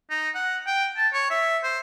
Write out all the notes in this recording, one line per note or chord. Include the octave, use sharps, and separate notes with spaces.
D#4
F#5
G5
A5
C#5
E5
C5